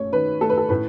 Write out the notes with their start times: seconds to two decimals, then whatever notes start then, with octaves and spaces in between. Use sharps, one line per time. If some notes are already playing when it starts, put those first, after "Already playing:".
Already playing: A3 C#5
0.12 D#3 B4
0.41 A3 A4
0.50 B4
0.57 A4
0.69 A2 B4